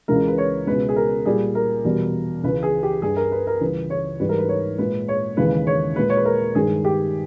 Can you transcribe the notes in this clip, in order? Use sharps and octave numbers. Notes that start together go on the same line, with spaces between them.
C#2 C#3 E3 G#3 A#4
B4
C#5
C#2 B2 G#3 B4
G#4
A#4
A#2 G3 G#4
A#4
E2 B2 G3
C#2 C#3 E3 B4
G#4
G4
G2 G3 G#4
A#4
B4
A#4
C#2 C#3 E3 G3 B4
C#5
G#2 E3 G3 B4
A#4
B4
C#5
A#2 G#3 B4
C#5
D#2 C#3 E3 G#3 B4
C#5
A#2 G#3 B4
C#5
B4
A#4
G2 D#3 G#3 G#4
G4